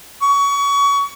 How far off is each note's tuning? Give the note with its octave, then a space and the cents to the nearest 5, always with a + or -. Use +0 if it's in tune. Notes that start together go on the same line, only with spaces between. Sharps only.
C#6 +30